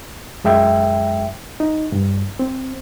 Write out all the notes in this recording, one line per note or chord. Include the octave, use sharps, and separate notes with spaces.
F#2 G#3 E5 G5
D#4
G2
C4